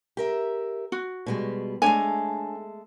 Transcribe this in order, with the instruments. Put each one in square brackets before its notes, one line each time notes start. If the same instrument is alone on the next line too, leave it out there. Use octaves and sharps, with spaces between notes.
[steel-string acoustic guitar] G4 A#4 E5
[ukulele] F#4
[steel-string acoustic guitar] B2 G3 G#3
[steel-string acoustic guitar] G#3 A3 A4 [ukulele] D4 C#5 G#5